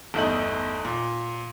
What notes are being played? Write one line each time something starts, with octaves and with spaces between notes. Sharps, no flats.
G1 E2 A3 D#4 G6 F#7
A#2